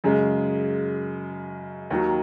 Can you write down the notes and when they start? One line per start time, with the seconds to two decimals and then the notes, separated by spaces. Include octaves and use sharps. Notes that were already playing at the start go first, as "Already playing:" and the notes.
0.04 F#2 C#3 G#3
1.90 D#2 D#3 F#3